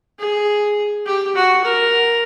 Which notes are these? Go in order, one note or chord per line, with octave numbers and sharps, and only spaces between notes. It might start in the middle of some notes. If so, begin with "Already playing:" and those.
G#4
G4
F#4
A#4